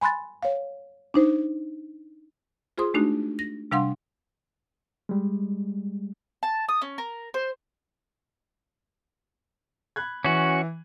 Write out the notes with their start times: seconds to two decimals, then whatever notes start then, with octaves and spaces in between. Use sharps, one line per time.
0.01 G#5 B5 C6 F#6 A6
0.43 C#5 F5
1.14 D4 D#4 C5
2.78 F4 G#4 C5 C6 D#6
2.94 G#3 A3 D4 D#4 F#4
3.39 A#6
3.71 C3 G3 D4 F5 F#5 C6
5.09 G3 G#3
6.43 A5
6.69 D#6
6.82 C#4
6.98 A#4
7.34 C5
9.96 B5 F#6 G#6
10.25 E3 C#4 F#4